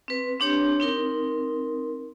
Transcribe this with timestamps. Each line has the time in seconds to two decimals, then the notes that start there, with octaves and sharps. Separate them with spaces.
0.08 C4 B4
0.40 C4 D4 G4 C#5
0.80 C4 D#4 A#4